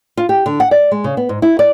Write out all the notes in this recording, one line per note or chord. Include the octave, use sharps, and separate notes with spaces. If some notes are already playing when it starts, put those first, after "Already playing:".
F4
G4
D3
F#5
D5
G#3
C#3
B3
G#2
E4
D5